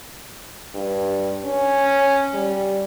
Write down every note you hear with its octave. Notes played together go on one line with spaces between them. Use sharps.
G2
C#4
G3